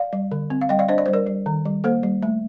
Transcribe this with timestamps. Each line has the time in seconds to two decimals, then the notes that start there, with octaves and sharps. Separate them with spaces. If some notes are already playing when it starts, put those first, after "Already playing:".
Already playing: D5 F5
0.13 G3
0.32 D3
0.50 C4
0.61 F5
0.69 G3 D#5 G5
0.79 D5 F5
0.89 D4 C5 D#5
0.98 D5
1.06 G3 C5
1.13 A#4 D5
1.27 G3
1.46 D#3
1.65 G3
1.84 A#3 A4 C5
2.03 G3
2.23 A3